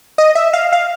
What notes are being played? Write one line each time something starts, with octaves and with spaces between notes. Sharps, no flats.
D#5
E5
F5
F5